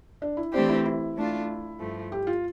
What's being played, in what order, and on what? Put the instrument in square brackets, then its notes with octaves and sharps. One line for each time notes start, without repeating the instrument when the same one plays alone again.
[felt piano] D4
E4
[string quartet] E3 A3 C4 G4 C5 [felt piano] D4
[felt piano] E4
E4
[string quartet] A3 D4 F4
G2 F3 A3
[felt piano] G4
F4